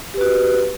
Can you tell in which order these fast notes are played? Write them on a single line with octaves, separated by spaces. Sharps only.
G4 B4 F#4